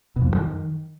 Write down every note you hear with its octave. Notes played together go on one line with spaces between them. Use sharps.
B2
F2
G2
F#2
D#3